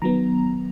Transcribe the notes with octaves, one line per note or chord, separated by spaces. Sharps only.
D#3 F#3 B3 A#5